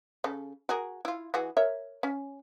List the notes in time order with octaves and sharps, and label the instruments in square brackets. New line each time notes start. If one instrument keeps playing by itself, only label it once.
[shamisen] C#3 A4
F#4 G#4 A#4
E4 F4
E3 F#4 G#4
A#4 C#5 E5
C#4